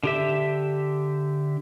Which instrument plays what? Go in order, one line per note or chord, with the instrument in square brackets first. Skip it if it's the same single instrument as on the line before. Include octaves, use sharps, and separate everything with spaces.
[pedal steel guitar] D3 G4 E5